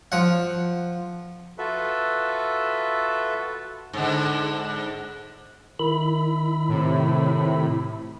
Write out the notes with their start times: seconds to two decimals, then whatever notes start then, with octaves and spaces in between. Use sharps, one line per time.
0.12 F3 F#5
1.58 F4 F#4 A4 B4 E5
3.93 G#2 D3
5.79 D#3 E4 B5
6.69 A2 C3